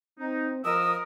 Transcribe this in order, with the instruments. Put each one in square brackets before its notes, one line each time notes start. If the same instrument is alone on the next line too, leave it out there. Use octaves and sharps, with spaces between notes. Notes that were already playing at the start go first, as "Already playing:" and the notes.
[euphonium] C4 [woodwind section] D#4
[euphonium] F3 [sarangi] A#4 [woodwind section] D#5 E6 [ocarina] D#6